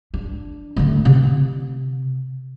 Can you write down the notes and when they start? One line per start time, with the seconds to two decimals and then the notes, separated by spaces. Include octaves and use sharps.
0.14 D4
0.76 D3 A3
1.05 C3